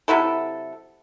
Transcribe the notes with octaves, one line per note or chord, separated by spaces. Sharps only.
C3 F#3 E4 A4